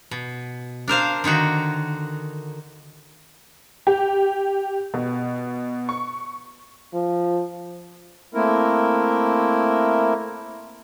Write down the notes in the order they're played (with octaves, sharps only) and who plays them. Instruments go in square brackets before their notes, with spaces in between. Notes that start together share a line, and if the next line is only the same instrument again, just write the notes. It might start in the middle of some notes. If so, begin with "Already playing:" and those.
[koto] B2
D4 A#4 C5 F5
D3 D#3 D#4 F#4
[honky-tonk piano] G4
B2
C#6
[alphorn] F3
[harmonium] A3 A#3 C4 E4 A#4